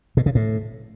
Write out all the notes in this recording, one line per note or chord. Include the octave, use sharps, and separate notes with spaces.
B2
C#3
A2